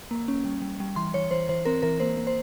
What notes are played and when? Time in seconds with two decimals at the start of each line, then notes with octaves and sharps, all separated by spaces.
0.11 A#3
0.28 C#4
0.45 G3
0.62 G3
0.80 G3
0.96 E3 C6
1.14 E3 C#5
1.31 E3 C5
1.49 E3 C5
1.65 C4 A#4
1.82 E3 A#4
2.00 A#3 C5
2.17 A#3
2.27 C5